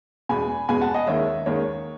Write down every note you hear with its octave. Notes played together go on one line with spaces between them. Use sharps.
E2 B2 G#3 G#5 B5
E2 B2 G#3 G#5 B5
F#5 A5
D#5 F#5
D#2 D#3 G#3 C#5 E5
D#2 D#3 G#3 C#5